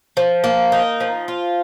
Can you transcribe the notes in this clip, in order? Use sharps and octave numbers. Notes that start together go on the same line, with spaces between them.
F3
A#3
D#4
F3
F4